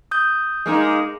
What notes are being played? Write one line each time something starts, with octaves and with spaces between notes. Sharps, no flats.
D#6 G6
G#3 A#3 D#4